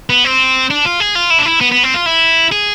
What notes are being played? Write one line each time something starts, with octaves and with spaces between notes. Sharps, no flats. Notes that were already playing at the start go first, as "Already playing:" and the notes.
B3
C4
D4
F4
G#4
F4
E4
D4
E4
B3
B3
C4
F4
E4
G#4